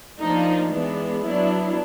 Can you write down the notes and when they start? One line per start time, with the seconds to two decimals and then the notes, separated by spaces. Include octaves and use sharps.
0.20 F3 A#3 D4 D#4
0.71 E3 G#3 B3 D4
1.21 F#3 B3 D4 E4